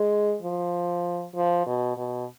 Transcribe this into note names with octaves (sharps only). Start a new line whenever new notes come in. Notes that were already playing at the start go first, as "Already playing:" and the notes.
Already playing: G#3
F3
F3
B2
B2